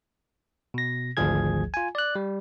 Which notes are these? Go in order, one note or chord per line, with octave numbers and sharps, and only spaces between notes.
B2 A#6
G#1 D2 F3 G#4 G#6
F4 G#5
D5 F#6
G3